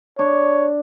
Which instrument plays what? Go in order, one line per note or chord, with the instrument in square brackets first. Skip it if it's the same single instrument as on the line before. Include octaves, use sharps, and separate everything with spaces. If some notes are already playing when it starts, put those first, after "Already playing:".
[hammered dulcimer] D4 [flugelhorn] C#5